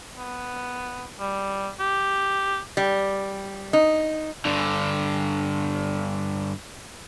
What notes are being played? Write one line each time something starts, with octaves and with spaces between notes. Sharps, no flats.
B3
G3
G4
G3
D#4
G2 D3